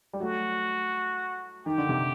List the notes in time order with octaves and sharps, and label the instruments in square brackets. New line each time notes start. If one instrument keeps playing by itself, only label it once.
[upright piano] G3
[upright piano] F#3 A3 [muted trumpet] F#4
[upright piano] D#3 [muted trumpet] G4
[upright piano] D3
C3